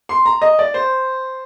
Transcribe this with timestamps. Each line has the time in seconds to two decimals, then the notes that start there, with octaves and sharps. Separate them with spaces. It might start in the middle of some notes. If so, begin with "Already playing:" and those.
0.09 C6
0.26 A#5
0.42 D#5
0.59 D5
0.74 C5